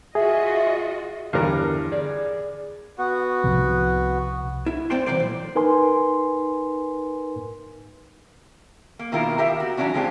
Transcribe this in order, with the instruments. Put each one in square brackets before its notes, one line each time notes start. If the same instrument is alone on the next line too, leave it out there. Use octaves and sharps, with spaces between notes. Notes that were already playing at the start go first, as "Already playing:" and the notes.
[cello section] F4 F#4 D#5 [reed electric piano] G#4 [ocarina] E5
[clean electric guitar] E2 D3 E4 [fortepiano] G2 A#4
[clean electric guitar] G#4 D5
[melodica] B3 F#4
[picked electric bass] C2 C3 F3
[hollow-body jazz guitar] E4
F#2 C4 D5 G5 C6
C2 E3 F#3 C5 D5
A#2
[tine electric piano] D#4 A#4 B4 G#5 C6
[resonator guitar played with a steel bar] A#3
B2 D#3 A#3 E4 F4 A#4
G4 A#4 E5 F5
F#4
E3 F#3 C#4 D4 F#4
G#3 A#3 C4 D4 F4 G4